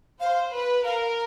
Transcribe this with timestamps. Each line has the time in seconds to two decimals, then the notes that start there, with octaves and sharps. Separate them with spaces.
0.20 C5 F5
0.53 B4
0.85 A#4 F5